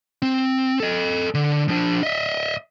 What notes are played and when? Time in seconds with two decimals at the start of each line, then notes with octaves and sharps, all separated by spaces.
0.22 C4
0.80 A4 D#5
1.34 D3
1.68 F3 D4
2.03 D#5 E5